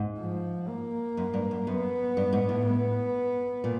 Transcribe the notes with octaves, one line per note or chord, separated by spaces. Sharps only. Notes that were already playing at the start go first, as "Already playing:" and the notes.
Already playing: G#2
F3
A#3
F#2
G2
F#2
F#2 B3
G2
G#2
A2
B3
A#2